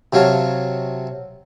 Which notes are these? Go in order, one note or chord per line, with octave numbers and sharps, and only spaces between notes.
C3 F#3 C#5 F5 A5